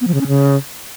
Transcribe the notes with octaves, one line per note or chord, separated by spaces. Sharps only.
B3
F3
C#3
C#4
C#3